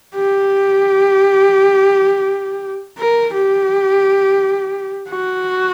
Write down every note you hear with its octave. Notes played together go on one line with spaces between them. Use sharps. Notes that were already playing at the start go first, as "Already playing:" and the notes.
G4
A#4
G4
F#4